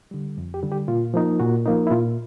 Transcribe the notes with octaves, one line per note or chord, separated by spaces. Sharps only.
D3 G3
F2
G4
D3 G3
G4
A#2 F4
F3 A#3 D#4
A#2 F#4
F3 A#3 D#4
E4
A#2 F4